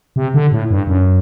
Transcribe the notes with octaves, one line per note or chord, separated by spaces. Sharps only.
C3
D3
A2
G2
F#2